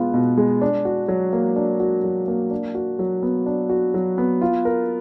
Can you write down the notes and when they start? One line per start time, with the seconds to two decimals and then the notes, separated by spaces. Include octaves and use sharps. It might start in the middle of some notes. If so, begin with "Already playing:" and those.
Already playing: B2 G#3 B3 F4
0.14 B2
0.37 G#3
0.61 D4
0.85 F#4
1.08 F#3
1.33 A#3
1.56 D4
1.80 F#4
2.04 F#3
2.28 A#3
2.51 D4
2.75 F#4
2.99 F#3
3.23 B3
3.46 D4
3.69 F#4
3.94 F#3
4.18 B3
4.41 F4
4.65 A#4